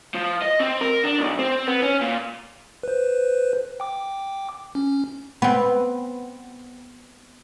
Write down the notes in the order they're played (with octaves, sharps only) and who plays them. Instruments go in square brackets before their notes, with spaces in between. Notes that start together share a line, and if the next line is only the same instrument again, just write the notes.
[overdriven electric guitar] F3
D#5
C4
A#4
D4
B1
C4
B3
C#4
A#2
[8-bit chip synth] B4 C5
G5 D6
C#4
[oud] B3 C4